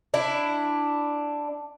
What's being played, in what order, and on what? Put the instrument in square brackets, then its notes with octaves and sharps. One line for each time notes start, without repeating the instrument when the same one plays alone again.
[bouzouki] D4 E4